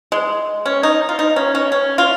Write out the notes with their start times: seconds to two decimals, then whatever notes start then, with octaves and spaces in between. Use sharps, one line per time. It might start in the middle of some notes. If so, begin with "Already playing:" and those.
0.12 G#3
0.66 C#4
0.83 D#4
1.09 F4
1.19 D#4
1.36 C#4
1.55 C#4
1.72 C#4
1.98 F4